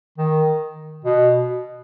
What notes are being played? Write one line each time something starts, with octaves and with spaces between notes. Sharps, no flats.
D#3
B2